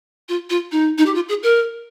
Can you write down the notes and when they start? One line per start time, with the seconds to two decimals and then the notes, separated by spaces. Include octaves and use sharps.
0.28 F4
0.49 F4
0.71 D#4
0.98 D#4
1.06 G4
1.14 F4
1.28 G#4
1.42 A#4